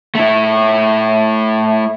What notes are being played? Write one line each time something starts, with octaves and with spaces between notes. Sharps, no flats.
A3 E4